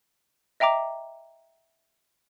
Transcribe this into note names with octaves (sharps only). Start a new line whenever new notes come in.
D#5 E5 G5 A#5 D6